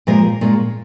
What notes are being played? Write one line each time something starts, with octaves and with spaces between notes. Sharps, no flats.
A#2 F3 G#3 F4 A#4
A#2 G#3 C#4